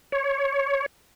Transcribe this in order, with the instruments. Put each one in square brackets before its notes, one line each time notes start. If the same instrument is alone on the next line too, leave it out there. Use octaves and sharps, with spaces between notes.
[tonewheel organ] C#5